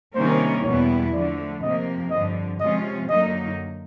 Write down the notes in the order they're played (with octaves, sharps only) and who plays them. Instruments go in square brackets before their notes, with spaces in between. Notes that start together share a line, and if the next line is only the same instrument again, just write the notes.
[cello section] C3 D#3 G3 A#3 C#4 [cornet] C5
[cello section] E2 B2 G3 B3 E4 [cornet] C#5
[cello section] D3 F3 A3 [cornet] D5
[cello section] F2 C3 F3 A#3 [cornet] D#5
[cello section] G2 D3 F3 [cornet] D#5
[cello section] C3 F3 G#3 C#4 F4 [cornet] D#5
[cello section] F#2 D3 F#3 A#3 D#4 [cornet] D#5